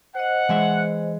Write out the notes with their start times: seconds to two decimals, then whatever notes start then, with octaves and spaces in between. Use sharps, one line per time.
0.15 C5 D#5 F#5
0.49 E3 G#3 E5